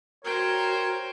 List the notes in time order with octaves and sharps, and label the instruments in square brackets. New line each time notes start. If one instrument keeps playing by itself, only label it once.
[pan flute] F#4 [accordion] A#4 [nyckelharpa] C5 G5 [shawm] C#5